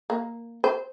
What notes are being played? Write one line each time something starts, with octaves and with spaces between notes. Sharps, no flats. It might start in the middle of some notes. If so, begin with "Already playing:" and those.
A#3
C5